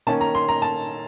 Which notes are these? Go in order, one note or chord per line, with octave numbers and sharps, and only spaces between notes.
D#3 A#3 C#4 A5
A#5
C6
A#5
A5